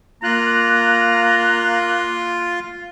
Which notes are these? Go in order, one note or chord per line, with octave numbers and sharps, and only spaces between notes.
A#3 F4 A#5 F#6